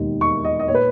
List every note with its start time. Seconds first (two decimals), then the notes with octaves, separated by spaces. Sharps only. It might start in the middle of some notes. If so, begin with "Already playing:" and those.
Already playing: E1 D#2 D#3
0.21 C#6
0.45 D#5
0.60 D#5
0.68 A#2 C#5
0.75 B4